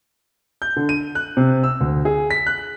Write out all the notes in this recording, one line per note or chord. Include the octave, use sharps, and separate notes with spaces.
G6
D3
D#7
F#6
C3
E6
D2
G#4
B6
F#6